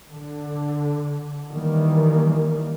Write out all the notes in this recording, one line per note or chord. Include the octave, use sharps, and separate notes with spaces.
D3
D#3 E3 G3 A#3